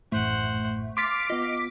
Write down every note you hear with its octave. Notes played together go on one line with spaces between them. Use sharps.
A1 F#2 A2 A3 C5 F#5
F5 C6 D6 A6 B6 D7
B3 F4 D#5